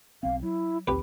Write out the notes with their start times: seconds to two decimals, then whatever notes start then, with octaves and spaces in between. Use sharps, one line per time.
0.23 B1 C4 F5
0.43 F#3 E4
0.87 A#1 D#2 C4 G4 B4